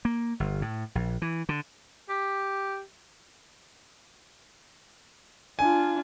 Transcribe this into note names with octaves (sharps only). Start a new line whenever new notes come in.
A#3
G1
A2
A#1
E3
D3
G4
D4 F4 G#5